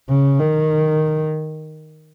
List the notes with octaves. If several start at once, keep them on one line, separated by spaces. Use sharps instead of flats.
C#3
D#3